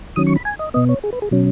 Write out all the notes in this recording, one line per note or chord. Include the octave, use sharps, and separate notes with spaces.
D#3 F#3 C#4 D#6
C#6
B5
G#5
D#5
B2 B3 D#5
C#5
G#4
B4
G#4
B2 F#3 C#4